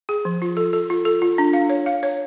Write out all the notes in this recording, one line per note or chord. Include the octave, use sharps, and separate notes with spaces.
G#4
F3
F4
A4
A4
F4
A4
F4
D4
F5
C#5
F5
C#5